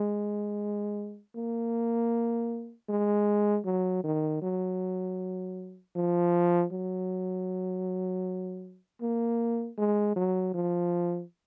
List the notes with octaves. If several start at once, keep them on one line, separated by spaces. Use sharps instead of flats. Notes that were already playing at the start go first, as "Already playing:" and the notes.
Already playing: G#3
A#3
G#3
F#3
D#3
F#3
F3
F#3
A#3
G#3
F#3
F3